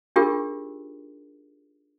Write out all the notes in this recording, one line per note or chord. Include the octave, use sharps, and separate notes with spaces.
D4 D#4 F4 G4 G#4 A#4